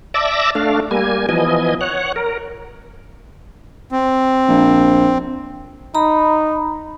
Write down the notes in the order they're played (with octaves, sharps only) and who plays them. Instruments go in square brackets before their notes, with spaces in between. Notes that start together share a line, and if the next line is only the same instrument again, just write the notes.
[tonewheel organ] D5 E5 A5 D6 E6 A#6
A3 D4 F5
G3 A#3 G#5
E3 F3 B3 D#5 G#5
C#5 F#5
A#4
[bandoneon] C4
[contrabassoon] A#1
[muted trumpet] D#4 [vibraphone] A#5 B5